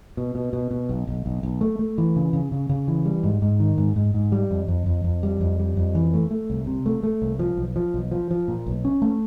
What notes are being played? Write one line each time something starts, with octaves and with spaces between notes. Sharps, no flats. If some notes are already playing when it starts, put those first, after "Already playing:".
B2
B2
B2
B2
B1
B1
B1
B1
A3
A3
E3
C#3
C#3
C#3
C#3
E3
G3
G#2
G#2
D#3
G#2
G#2
G#2
G3
F2
F2
F2
F2
G3
F2
G3
F2
E3
A3
A3
C2
C3
A3
A3
C2
F3
B1
F3
B1
F3
F3
A#2
B1
C#4
A3